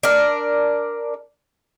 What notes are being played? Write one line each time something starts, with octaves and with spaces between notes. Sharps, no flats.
D4 A#4